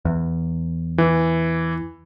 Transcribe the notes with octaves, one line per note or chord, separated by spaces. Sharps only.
E2
E3